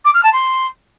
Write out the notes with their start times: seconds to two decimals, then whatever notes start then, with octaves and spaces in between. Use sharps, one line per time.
0.05 D6
0.14 F6
0.24 A5
0.33 C6